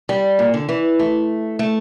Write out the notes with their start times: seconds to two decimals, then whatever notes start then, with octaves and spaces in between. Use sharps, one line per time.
0.09 G3
0.39 A#2
0.54 D3
0.69 E3
0.99 A3
1.59 A3